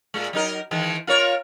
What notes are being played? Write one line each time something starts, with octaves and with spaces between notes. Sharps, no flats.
A#2 G#3
F#3 D#4 A#4
D#3 E3 G#3
F4 A#4 C#5